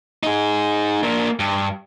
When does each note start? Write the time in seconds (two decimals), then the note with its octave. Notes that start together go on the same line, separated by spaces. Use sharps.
0.23 D#4 G#4
1.03 A#3 D4
1.40 G2